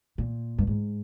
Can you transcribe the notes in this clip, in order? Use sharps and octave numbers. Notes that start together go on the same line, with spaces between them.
A#2
G2
G#2